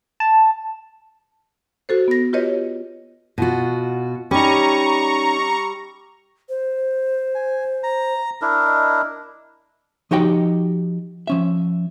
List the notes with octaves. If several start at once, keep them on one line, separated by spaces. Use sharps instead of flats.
A5
F#4 A4 C5
B3 A#6
F4 G4 B4 C#5 D#5
B2 F4 F#4
G3 C#4 D#4 A#5 C#6
C5
G#5
A#5
D4 E4 A#4
D#5
F3 D#4 F#4 G4 D#5 G5
F3 C#4 E5